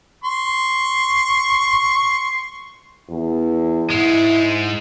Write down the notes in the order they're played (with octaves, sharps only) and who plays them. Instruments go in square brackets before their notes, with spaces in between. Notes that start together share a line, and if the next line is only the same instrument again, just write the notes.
[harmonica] C6 C#6
[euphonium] E2
[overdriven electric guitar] G#2 G#3 [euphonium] E4